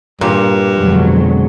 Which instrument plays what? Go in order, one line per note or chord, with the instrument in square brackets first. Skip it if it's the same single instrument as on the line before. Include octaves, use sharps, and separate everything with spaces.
[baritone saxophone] G2 [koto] A#2
[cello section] F2 F#3 [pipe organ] B2 D3 G#3